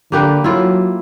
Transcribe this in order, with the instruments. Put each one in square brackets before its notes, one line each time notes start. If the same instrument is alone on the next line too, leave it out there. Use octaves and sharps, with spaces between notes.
[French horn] D3 [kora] A#3 G4 B4
[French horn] F#3 [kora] E4 F4